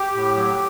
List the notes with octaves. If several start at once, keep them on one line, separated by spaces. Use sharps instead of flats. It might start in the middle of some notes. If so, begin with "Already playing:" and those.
Already playing: G4
A2
F#3